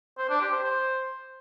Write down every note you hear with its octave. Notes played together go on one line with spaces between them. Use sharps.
C5
D4
G4
C5
C5